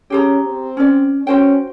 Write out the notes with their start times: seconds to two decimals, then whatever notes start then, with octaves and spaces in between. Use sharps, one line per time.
0.10 C#4 G4 G#4 A#5
0.46 C4
0.77 C#4 D5
1.27 C#4 F#4 C5 G5